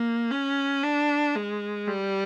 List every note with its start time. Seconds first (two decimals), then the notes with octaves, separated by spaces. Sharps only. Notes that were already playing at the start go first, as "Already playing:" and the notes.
Already playing: A#3
0.31 C#4
0.83 D4
1.35 G#3
1.87 G3